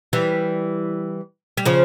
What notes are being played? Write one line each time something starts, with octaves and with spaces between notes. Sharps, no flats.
E3 G3
G3
C#3 F3